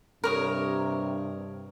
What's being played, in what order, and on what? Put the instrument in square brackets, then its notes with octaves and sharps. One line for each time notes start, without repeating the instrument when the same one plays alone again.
[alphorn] G2 [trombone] C3 [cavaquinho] A#4 C#5 D#6